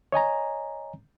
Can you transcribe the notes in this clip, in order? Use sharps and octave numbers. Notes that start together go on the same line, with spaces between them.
C#5 D#5 G#5 A#5